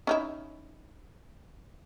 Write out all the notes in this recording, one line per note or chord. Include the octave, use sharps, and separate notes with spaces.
C#4 D#4 E4